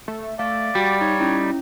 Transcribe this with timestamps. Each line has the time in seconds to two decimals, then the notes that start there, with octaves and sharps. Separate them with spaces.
0.08 A3
0.39 A3 D5 F5
0.75 G3 F#4
1.01 D#4 C#5
1.19 C#4 D#4 E4